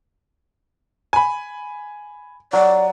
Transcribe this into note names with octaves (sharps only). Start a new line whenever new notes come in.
G#5 B5
F#3 D5